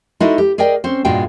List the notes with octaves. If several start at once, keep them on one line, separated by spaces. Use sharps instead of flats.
G#3 D#4 E4 F#4 A4
G4
G#4 A#4 D5 D#5 G5
C4 C#4 C5
G2 A#2 G#3 F#4 G5